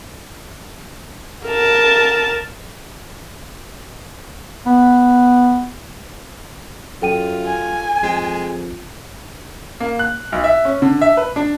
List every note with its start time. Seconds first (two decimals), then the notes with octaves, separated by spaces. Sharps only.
1.47 A#4 A5
4.66 B3
7.02 F#2 F4 A4 G5 D#7
7.46 G#5
8.03 F2 G#3
9.80 A#3
9.99 F#6
10.32 B1
10.44 E5
10.65 C#4
10.82 D3
11.01 E5
11.17 B4
11.36 D4